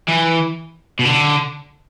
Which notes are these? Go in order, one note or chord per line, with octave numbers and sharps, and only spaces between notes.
E3
B2
D3